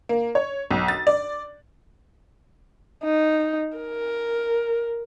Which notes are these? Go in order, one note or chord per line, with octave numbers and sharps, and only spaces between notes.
A#3
C#5
B1
A6
D5
D#4
A#4